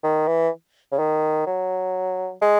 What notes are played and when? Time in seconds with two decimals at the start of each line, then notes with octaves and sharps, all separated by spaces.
0.04 D#3
0.27 E3
0.92 C#3
0.99 D#3
1.47 F#3
2.42 G#3